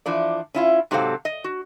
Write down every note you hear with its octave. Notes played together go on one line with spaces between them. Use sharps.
E3 F3 D4 D5
C#4 E4 F4
G#2 C3 F#3 C4 A4 F5
D#5
F#4